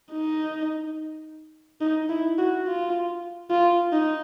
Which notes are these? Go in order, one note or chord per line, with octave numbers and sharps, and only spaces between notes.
D#4
D#4
E4
F#4
F4
F4
D#4